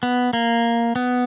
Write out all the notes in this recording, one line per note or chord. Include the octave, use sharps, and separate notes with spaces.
B3
A#3
B3